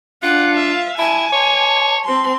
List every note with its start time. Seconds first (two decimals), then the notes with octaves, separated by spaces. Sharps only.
0.23 D4 F4 F#5
0.54 E5 F5
0.98 E4 G#5 A5
1.32 C#5
2.05 C4 C6